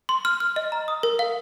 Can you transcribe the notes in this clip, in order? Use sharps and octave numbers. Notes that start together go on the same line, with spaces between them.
C6
F6
F6
D#5
A#5
D#6
A#4
F5